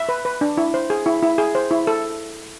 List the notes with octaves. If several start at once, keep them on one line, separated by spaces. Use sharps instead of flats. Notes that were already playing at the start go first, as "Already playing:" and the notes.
Already playing: E5
B4
B4
D4
E4
C5
G#4
E4
E4
G#4
C5
E4
A4